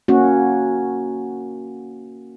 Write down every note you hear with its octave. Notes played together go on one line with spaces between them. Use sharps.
A#3 C#4 F#4